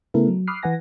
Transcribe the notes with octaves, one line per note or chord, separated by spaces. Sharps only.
C#3 A3 B3 E4 A4 A#4
F#3
B5 D6 D#6 F6 F#6 C7
E3 B4 F#5 G#5 A#6